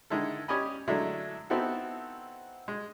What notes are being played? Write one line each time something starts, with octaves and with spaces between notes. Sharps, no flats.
D3 D#3 G#3 E4 A4
C#4 G4 D5 D#5 G#5 B5
D3 F#3 G#3 A3 D4 E4
B3 C4 D#4 E4 F#4 A4
G#3